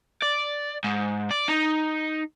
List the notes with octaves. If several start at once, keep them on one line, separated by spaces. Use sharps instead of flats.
D5
G#2
D5
D#4